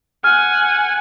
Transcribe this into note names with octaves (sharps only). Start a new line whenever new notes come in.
F#5 G#5 F6